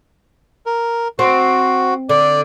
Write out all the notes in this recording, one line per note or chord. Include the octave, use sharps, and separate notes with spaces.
A#4
C4 F#4
D3 D5